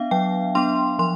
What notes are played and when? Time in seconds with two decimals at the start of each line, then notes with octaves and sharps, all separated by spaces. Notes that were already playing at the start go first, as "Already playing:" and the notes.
Already playing: B3 D4 E5 F5
0.11 F#3 G5
0.55 B3 D4 C6
0.99 F3 C6